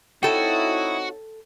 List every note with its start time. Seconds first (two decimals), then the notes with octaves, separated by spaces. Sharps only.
0.23 C4 D#4 E4 F#4 A4 C#5 G5 D#6